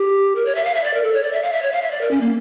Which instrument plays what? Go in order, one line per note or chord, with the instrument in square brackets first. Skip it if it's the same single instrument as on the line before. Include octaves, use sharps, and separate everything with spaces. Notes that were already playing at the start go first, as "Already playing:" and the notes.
Already playing: [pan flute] G4
A#4
C#5
E5
F5
E5
D5
A#4
A4
C#5
D5
E5
F5
E5
C#5
F5
E5
D5
A#4
C#4
A#3